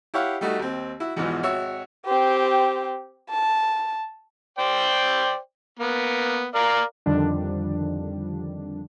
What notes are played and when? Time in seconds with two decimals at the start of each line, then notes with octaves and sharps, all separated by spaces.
0.14 E4 G4 C#5 F5 F#5
0.41 G3 A3 D#4 F#4
0.59 D#2 C4
1.00 E4 F#4
1.16 E2 G#2 B2 E3 F3
1.43 G#1 F#4 C#5 E5
2.06 C4 G4
3.30 A5
4.58 C5 D5 G5
5.79 A#3 B3
6.55 A#4 D5 F5
7.06 F2 D3 D#3 F3 G3 D4